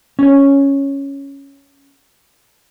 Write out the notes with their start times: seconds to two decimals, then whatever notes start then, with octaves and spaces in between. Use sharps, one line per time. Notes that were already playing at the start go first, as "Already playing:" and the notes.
0.19 C#4 C#5